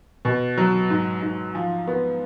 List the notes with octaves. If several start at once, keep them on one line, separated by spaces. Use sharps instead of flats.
B2
F#3
G#2
G#2
F3
B3